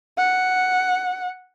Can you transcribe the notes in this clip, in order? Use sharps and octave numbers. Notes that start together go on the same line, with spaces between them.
F#5